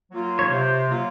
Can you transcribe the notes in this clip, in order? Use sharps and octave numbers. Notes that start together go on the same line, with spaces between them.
F#3 A#3 F4
C#5
C3 C5
F#3 A#3 F4